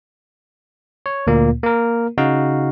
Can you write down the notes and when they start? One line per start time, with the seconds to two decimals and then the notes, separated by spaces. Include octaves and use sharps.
1.06 C#5
1.27 D2 A#2 A#3
1.63 A#3 A#4
2.18 C#3 D#4 F#4 F5